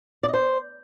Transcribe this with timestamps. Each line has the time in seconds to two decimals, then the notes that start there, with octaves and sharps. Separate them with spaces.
0.23 D5
0.28 D#5
0.33 C5